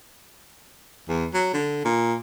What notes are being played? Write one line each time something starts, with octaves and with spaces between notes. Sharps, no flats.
E2
F#3
D3
A#2